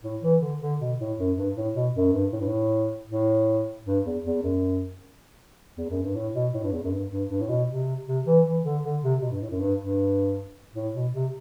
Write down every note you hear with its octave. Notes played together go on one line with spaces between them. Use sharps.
A2
E3
D3
D3
B2
A2
F#2
G2
A2
B2
F#2
G2
A2
G2
A2
A2
G2
E2
E2
F#2
E2
F#2
G2
A2
B2
A2
G2
E2
F#2
G2
G2
G2
A2
B2
C3
C3
E3
E3
D3
D3
C3
B2
G2
A2
F#2
G2
G2
A2
B2
C3